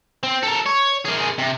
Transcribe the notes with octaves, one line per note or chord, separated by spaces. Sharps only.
C4
A4 A#4
C#5
A#3 G#4
C3